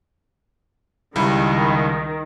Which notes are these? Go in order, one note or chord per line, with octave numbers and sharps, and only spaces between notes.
C#2 D#3 G3 E4